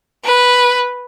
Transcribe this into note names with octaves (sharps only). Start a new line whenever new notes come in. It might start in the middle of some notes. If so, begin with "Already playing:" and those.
B4